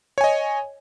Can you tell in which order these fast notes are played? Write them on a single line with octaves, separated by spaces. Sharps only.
C#5 G#5 D#5